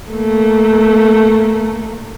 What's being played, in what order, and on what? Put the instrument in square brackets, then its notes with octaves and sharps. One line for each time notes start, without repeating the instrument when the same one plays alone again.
[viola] A3 A#3